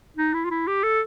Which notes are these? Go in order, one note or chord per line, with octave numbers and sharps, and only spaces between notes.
D#4
E4
F4
E4
G4
A4